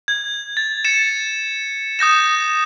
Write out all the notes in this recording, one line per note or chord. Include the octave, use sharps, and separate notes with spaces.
G#6
A6
A6 C#7 E7
D#6 G6 A#6 E7